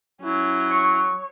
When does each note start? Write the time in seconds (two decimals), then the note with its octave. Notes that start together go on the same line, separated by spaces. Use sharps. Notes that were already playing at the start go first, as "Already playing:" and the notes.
0.22 F#3 C#4 E4
0.71 C#5